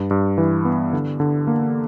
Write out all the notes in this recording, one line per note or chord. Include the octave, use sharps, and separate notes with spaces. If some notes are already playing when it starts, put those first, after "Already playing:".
Already playing: G2
G2
E3
B3
D3
D3
A#3